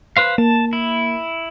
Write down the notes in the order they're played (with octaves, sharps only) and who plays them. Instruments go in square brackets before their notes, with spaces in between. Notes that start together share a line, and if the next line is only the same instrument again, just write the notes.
[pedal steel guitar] B4 C5 F5
[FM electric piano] A#3 [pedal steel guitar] A5
[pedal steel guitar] E4